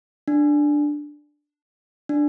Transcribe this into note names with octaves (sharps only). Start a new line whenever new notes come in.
D4
D4